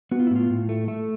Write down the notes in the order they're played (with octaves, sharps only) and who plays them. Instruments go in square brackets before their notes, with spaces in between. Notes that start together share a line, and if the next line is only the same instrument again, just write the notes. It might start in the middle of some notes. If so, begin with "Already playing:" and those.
[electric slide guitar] B3 F#4
F4
E4
A2 F4
A2
A3
A3